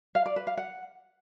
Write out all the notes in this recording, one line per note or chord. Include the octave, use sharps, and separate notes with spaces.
F5
D5
B4
F5
F#5